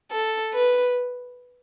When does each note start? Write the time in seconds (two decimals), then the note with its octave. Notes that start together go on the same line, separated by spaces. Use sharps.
0.12 A4
0.53 B4